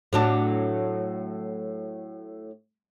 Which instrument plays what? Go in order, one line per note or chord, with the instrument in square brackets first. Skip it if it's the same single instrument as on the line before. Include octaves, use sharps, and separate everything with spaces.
[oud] A2 F#3 D4